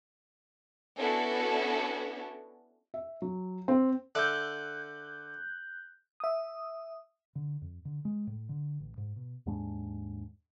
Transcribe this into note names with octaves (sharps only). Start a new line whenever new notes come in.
B3 C#4 D4 E4 F#4 A4
E5
F#3
C4
D3 E5 D6 F#6 G6
E5 D#6
D3
F2
D3
G#3
A2
D3
A1
G#2
B2
D#2 G#2 G#3 D4